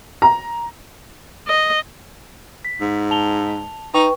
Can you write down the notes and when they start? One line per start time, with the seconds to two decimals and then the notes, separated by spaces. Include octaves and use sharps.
0.22 A#5
1.48 D#5
2.65 B6
2.81 G#2
3.11 A5 F7 G7
3.94 D#4 B4 G5 C#6